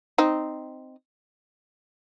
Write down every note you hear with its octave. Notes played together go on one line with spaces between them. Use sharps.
C4 D#4